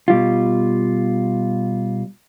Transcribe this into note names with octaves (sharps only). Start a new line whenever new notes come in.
B2 G3 F4